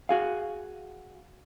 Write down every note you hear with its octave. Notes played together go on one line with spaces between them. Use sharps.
F#4 G#4 F5